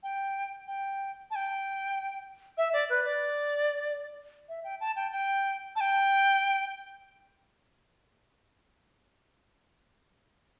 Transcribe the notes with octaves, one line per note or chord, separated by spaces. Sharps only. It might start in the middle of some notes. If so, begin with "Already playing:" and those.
G5
G5
A5
G5
E5
D5
B4
D5
E5
G5
A5
G5
G5
A5
G5